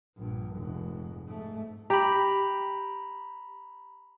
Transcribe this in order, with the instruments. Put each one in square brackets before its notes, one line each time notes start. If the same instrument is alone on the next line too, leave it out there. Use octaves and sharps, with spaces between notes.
[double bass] A#1 G2
F1 G#2
G#2 A3
[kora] G4 [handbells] A#5 B5